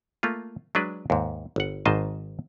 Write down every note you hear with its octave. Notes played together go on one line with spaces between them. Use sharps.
A3 A#3 F4
F#3 G#3 D4 B4
D#2 G#2
G1 F#5
G#1 G#2 D#3 C5 D#5 A5